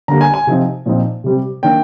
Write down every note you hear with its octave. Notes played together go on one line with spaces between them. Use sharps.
D3 G3 A#3 A#5
G#5
G#5
C3 F3 C4 D#4
A#2 F3 C4 D#4
C3 G3 C4
D#3 A#3 D4 G5